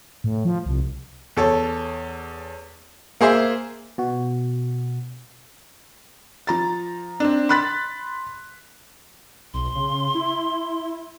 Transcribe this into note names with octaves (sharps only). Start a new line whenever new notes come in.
A2
F3
C2
E2 A4 C#5
A#3 G#4 C5 E5
B2 F#4
F3 A#5 A6
C4 D4
B5 C6 F#6 A6 B6
B1 C6
C#3
E4